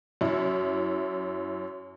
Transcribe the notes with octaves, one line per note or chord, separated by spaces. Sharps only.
F#2 E4